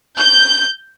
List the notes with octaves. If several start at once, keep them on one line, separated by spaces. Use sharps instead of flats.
G6